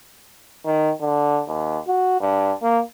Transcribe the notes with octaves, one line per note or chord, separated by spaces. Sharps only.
D#3
D3
D#2
F#4
G2
A#3